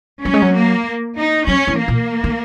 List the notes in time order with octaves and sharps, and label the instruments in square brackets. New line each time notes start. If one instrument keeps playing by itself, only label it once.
[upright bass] F#3 [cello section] C#4
[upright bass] G#3
F#3
[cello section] A#3
D#4
[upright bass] F#3 [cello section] C#4
[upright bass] E3
[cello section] A#3
[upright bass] A#2
D#3